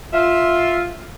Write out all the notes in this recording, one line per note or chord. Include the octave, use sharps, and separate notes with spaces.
F4 E5